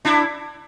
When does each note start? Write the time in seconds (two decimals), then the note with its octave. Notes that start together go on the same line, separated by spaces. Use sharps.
0.05 D4 E4